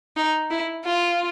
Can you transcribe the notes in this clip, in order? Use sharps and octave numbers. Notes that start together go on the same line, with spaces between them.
D#4
E4
F4